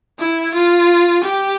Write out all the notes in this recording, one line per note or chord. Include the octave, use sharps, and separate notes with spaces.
E4
F4
G4